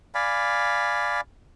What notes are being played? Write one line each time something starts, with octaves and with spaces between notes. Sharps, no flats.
D5 F5 G#5 B5